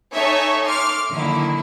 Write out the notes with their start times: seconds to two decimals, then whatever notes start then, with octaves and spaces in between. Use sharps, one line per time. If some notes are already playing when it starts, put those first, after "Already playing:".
0.13 D#4 A4 C#5 E5 G#5 C#6
0.66 C6 D6 F6
1.12 D3 D#3 F#3 A#3 E4